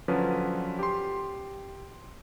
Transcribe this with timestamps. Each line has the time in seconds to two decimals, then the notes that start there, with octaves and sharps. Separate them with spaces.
0.08 D3 F3 F#3 C#4 B4
0.79 G4 C6